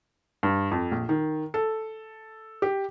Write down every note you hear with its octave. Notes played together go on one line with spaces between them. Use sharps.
G2
F2
A#1
D#3
A4
G4